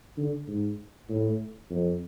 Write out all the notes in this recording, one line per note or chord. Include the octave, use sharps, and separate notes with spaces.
D3
G#2
A2
F2